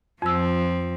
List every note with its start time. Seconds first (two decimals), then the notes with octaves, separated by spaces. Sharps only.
0.22 F2 F3 C4 E6